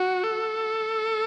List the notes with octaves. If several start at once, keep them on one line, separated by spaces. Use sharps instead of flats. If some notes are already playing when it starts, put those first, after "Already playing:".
Already playing: F#4
A4